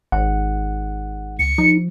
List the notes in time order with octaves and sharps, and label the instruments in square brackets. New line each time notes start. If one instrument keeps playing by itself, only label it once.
[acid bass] G#1 [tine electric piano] F#5
[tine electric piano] C#2 [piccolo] C#7
[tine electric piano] F3 [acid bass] D#4